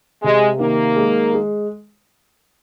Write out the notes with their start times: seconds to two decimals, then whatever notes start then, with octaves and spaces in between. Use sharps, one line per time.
0.23 C3 G#3
0.60 D#3 A#3
0.96 G#3
1.33 G#3